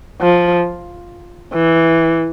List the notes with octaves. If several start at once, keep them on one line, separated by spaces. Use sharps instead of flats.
F3
E3